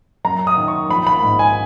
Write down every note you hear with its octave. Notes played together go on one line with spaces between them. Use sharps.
F#2 A#5
D#6
D#3
C#6
A#1 B5
B5
G#2
G#5